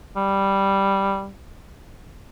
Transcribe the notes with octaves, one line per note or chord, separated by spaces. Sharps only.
G3